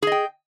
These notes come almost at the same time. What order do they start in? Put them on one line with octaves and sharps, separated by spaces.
G#4 D#5 G5